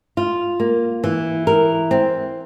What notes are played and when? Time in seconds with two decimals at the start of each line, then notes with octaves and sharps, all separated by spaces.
0.17 F4
0.60 A#3
1.04 E3
1.47 A#4
1.91 C4